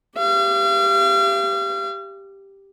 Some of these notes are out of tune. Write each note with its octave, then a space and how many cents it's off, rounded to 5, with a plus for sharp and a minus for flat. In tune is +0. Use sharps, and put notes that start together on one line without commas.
G4 +0 F5 -40